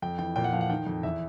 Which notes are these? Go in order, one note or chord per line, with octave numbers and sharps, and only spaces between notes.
F2 G5
E3 G5
A#2 G5
F#5
F3 F5
F#5
D#3 G5
F2
E2 E5